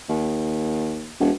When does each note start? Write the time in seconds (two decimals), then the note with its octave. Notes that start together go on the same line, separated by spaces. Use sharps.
0.09 D#2
1.20 E1